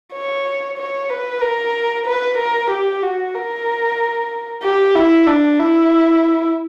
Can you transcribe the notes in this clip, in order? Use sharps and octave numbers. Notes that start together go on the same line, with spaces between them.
C#5
C#5
B4
A#4
B4
A#4
G4
F#4
A#4
G4
E4
D4
E4